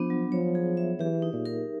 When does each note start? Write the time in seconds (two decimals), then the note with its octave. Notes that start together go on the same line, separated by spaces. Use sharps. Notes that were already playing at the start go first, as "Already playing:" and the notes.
Already playing: F3 B3 D4
0.10 F#3
0.32 F3 C#5
0.55 G#4
0.77 E5
0.99 E3 G4
1.22 D#4
1.33 A#2
1.46 A#4